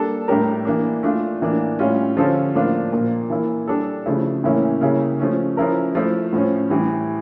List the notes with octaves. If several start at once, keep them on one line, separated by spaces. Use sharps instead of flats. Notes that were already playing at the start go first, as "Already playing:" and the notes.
Already playing: G3 A#3 D4 A4
A2 G3 D4 G4 A#4
E3 A#3 D4
A3 D4 F4
A2 E3 A#3 D4
A2 G3 C#4 F4
D3 F3 C#4 F4 A4
A2 F3 A#3 D4 F4
A#2 F3 A#3
E3 A#3 E4
G3 D4 A4
C#3 F3 A3 E4
A2 E3 A#3 C#4 E4
C#3 G3 A#3 C#4 E4
F3 A3 C#4
F3 C#4 E4 A#4
F3 A3 E4
A2 F3 C#4
A2 E3 G3